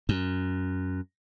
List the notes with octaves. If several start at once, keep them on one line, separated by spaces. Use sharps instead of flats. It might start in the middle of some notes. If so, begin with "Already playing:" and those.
F#2